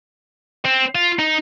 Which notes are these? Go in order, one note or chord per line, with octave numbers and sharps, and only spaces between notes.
C4
F4
D#4